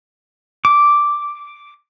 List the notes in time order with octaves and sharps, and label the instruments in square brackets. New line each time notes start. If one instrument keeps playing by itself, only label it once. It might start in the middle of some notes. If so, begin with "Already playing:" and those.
[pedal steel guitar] D6